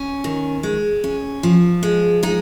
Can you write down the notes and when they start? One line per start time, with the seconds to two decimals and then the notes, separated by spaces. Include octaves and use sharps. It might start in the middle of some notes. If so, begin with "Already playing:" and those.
Already playing: C#4
0.24 D#3
0.63 G#3
1.04 C#4
1.43 F3
1.83 G#3
2.23 G#3 D#4